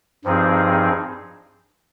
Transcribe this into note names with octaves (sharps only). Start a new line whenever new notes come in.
G2 F3 C4 D#4 G#4